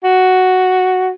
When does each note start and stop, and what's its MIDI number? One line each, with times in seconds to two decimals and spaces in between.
0.04 1.10 66